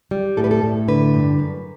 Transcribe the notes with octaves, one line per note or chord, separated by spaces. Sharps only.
G3
A2 A4
B4
A4
A2
D3 B4
G2
F#2